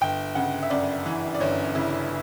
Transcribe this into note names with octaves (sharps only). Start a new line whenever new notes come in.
G1 G5
C#3 F#5
E5
F#2 D5
E3
D5
G1 C#5
C#3 E4